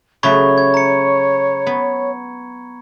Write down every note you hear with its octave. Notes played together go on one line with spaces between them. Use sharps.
C#3 F#3 A3 C#5 B5 C#6 G#6
G#6
A#5 C#7
B3